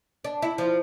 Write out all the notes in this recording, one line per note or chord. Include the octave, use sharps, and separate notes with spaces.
D4
E4
F3